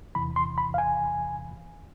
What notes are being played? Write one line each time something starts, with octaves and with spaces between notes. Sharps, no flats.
E2 C3 E3 B5
C6
B5
F5
G#5